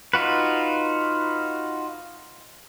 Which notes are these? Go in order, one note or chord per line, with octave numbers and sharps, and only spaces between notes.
D#4 F4 F#4 B4